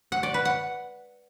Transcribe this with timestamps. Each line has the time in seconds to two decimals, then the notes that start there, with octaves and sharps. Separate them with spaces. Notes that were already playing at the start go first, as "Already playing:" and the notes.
0.12 F#5
0.23 D5
0.34 B4
0.45 F#5